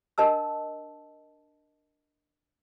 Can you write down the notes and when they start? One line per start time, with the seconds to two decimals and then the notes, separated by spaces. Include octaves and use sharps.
0.18 D4 A#4 D#5 A5 E6